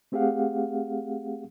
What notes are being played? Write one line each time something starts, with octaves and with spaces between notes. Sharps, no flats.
A3 C4 G4 G#4 F5 F#5